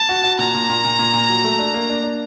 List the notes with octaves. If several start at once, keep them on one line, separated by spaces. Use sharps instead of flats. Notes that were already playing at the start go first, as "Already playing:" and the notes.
Already playing: A5
F#4
F#4
A#2 A#5
A#2
A#2
A#2
A#2
A#2
F#3
A3
D4
A#3
D4
D4